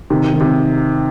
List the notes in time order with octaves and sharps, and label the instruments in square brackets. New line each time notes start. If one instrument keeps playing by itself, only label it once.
[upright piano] C3 [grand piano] D#3
[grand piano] D#3
[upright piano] C3